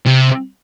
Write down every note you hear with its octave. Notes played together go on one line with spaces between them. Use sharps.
C3